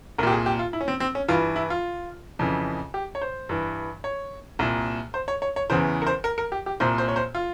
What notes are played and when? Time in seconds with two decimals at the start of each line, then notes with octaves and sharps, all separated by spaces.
0.18 C2 A#4
0.23 A#2 G4
0.32 G#4
0.46 G4
0.59 F4
0.73 E4
0.81 C#4
0.88 C4
1.00 C4
1.15 C#4
1.28 G2 E3 F4
1.56 E4
1.70 F4
2.39 F2 C#3 E3
2.94 G4
3.15 C#5
3.22 C5
3.49 G2 E3
4.04 C#5
4.59 C2 A#2
5.14 C5
5.28 C#5
5.42 C#5
5.56 C#5
5.70 E2 C#3 E3 C5
6.02 A#4
6.07 C5
6.24 A#4
6.38 A#4
6.52 G4
6.66 G4
6.80 C2 A#2 C5
6.98 C5
7.08 C#5
7.16 C5
7.35 F4